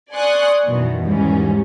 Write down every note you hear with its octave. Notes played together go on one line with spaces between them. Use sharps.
D5 G#5 C6 C#6 D#6 F#6
F#2 B2 D#3 E3
E2 G#2 D#3 E3 G3 C#4